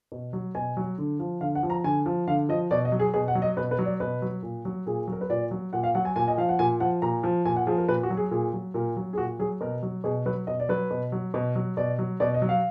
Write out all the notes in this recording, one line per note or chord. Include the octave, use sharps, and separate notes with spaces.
B2
F#3
B2 G#5
F#3
D3
F3
D3 F5
F#5
F3
A#5
D3 G#5
F3
D3 F5
F3 D#5
B2 D5
D#5
F#3
G#4
B2 G#4
F#5
F#3
D#5
B2 B4
B4
F#3
D5
B2 B4
F#3
A#2
F#3
A#2 G#4
F#3 A#4
B4
A#2 D5
F#3
A#2 F#5
F5
F#3 F#5
G#5
A#2 G#5
D#5
F3 F5
F#5
A#2 G#5
F3 F#5
A#2 A#5
F3
A#2 G#5
F#5
F3 G#4
A#4
A#2 B4
F#4
F#3
G#4
A#2 G#4
F#3
A#2 A#4
F#3
G#4
A#2 F#4
F#3 G#4
B2 A#4
F#3
B2 G#4
F#3 B4
B2 D#5
D5
F#3 B4
B2
F#3
B2
F#3
B2 D5
F#3
B2 D5
D#5
F#3
F5